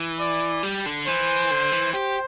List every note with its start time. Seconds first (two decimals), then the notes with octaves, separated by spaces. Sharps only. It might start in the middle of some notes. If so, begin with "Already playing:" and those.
Already playing: E3
0.20 D5
0.63 G3
0.86 D3
1.07 E3 C5
1.51 D3
1.72 E3
1.93 G4 C5